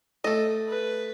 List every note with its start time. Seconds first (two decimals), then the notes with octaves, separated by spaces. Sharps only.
0.24 A3 A4 D#5
0.69 B4